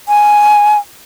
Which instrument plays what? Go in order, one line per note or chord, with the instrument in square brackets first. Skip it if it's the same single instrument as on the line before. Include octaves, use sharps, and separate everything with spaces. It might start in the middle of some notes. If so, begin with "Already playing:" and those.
[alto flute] G#5